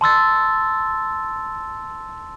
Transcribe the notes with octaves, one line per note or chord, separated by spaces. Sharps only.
A5 C6 E6 A6